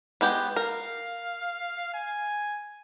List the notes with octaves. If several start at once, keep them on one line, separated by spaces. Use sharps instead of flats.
G#3 B3 G4
A#4 F5
G#5